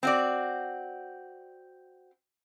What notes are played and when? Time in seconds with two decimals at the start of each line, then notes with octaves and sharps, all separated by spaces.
0.03 C4 F#4 D5